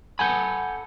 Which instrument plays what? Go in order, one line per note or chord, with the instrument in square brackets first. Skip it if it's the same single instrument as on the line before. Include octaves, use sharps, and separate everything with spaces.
[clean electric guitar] A4 F#5 B5 [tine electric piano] G#5 G6